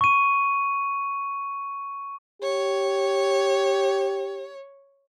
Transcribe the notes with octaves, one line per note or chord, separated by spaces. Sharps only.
C#6 D#7
G4 C#5